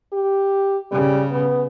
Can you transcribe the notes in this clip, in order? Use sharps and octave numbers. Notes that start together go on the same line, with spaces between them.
G4
C#3 G3
B3